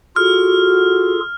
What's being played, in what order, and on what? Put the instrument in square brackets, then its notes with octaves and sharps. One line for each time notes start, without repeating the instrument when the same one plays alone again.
[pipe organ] F4 G#4 A4 [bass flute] F#4 [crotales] F6